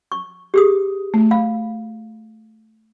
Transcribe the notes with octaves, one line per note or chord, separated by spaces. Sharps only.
C#6
G4 G#4 D#6
A3
F5 B5